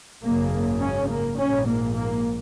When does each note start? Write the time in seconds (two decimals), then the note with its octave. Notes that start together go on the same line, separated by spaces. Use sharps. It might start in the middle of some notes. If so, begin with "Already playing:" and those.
0.23 G#1 F#2 C#3 A#3
0.81 C#4
1.09 A#3
1.38 A#1 G#2 C#4
1.66 A#3
1.95 A#3